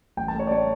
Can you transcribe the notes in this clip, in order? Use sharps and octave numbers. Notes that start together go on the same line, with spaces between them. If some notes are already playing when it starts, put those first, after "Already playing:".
A1 G5
A5
A3 C#5
D5
A2 C#5